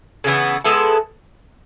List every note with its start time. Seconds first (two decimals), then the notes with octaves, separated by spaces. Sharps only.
0.24 C#3 E3 B3
0.64 G#3 B3 E4 A4